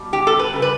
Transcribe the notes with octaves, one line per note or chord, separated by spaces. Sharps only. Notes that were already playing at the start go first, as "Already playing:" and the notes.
Already playing: B2 G3
G4
A4
B4
C#3 G3
B4